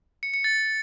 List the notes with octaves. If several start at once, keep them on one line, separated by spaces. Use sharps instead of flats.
C#7
C#7
A6